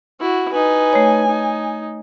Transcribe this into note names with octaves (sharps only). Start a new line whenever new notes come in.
E4 F#4
D#4 B4 G#5
A3 C#5
D#4